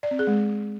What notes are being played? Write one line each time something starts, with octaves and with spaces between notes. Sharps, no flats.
D5
C4
G#4
G#3